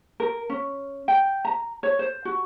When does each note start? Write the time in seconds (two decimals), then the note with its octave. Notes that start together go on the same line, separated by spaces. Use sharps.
0.20 A#4
0.50 C#4
1.08 G5
1.45 A#5
1.83 C#5
1.99 C5
2.25 F#4